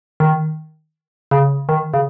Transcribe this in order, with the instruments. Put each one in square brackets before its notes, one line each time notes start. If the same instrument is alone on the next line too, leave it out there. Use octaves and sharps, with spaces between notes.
[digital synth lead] D#3
C#3
D#3
C#3